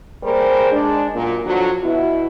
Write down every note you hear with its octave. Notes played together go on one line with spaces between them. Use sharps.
G3 A#3 G#4 A#4 C5
G#3 D4
F#2 A#2
D3 F3 F#3
B2 E4